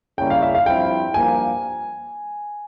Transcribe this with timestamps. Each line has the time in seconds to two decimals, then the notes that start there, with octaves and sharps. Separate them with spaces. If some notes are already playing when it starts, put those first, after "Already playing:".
0.18 C#3 G3 A#3 C#4 E4 G5
0.30 F5
0.42 E5
0.55 F5
0.66 G2 F3 C4 E4 G5
1.14 G2 F3 A#3 G#5